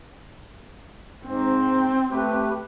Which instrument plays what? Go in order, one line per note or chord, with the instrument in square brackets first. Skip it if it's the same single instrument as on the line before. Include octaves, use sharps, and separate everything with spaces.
[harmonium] G#2 [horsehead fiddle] C4
[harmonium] A3 G4 B4